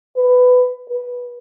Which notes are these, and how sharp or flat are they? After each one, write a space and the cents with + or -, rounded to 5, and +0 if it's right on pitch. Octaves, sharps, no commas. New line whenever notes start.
B4 +15
B4 -10